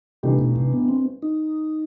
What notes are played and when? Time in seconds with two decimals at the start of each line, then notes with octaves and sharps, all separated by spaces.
0.23 G2 C3 E3 A3 D#4 G4
0.39 B2
0.56 C3
0.73 B3
0.88 C4
1.22 D#4